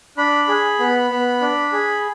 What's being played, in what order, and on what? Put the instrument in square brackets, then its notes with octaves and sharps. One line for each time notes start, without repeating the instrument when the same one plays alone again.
[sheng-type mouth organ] D4 B5
G#4
B3
B3
D4
G#4